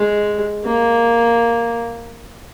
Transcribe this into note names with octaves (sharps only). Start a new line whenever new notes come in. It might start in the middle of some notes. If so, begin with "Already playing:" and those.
Already playing: G#3
A#3